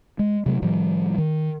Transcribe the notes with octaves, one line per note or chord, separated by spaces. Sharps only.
G#3
C3 F#3 A3
A2 D#3 F3 G3
D#3